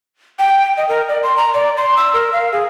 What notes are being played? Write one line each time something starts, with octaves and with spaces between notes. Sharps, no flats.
G5
D#5
A#4
D5
C6
A#5
D5
C6
E6
A#4
F5
G#4